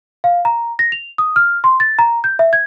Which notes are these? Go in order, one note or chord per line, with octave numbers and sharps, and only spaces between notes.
F5
A#5
A#6
F7
D#6
F6
C6
A6
A#5
G6
E5
G#6